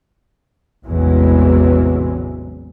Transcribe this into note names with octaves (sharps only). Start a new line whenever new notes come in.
A1 E2 C3 E3 F#3 G#3